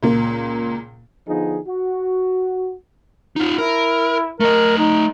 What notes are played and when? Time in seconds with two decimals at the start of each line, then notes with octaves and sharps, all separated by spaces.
0.03 C#2 A#2 A#3
1.28 D3 F3 B3 D#4 G#4
1.68 F#4
3.36 D#4 F4
3.58 E4 A#4
4.40 A3 A#4 D#5
4.78 D#4